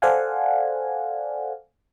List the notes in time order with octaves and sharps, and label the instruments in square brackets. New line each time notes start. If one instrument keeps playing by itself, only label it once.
[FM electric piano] A4 C5 D5 F5 F#5 G#5